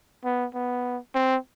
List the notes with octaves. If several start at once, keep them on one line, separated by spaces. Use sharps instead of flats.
B3
B3
C4